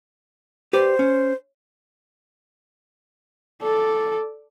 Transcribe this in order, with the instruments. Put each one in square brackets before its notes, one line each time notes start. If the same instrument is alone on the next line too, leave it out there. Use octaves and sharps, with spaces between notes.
[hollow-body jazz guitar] G4 B4 D5 [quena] C5
[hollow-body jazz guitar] C#4
[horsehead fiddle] A4 D5